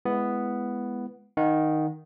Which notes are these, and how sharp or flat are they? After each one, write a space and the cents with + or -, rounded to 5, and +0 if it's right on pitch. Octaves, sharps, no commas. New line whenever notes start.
G#3 +0 B3 +0 E4 +20
D#3 +0 D#4 +0 F#5 -35